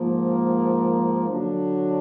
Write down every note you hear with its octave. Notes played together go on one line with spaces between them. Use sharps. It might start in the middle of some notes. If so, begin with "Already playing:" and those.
Already playing: G#2 F3 A#3
D3 F#3 D4